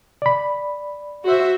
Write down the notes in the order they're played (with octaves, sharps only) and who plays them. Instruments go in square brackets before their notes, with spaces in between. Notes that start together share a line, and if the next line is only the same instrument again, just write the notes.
[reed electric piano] D5 B5
[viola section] F#4 C5 E5